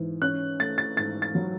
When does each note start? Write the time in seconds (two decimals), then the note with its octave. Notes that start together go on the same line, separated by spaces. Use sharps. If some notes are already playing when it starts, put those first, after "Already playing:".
Already playing: G#2 E3
0.22 C#4 F#6
0.59 A3 A6
0.78 A6
0.97 G#2 A6
1.22 A6
1.35 F#3